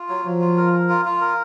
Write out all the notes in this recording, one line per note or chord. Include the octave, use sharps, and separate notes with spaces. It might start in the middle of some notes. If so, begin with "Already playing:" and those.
Already playing: F4
F#3
F3 F#3
F4
A#4
A#4
F4
F4
A#4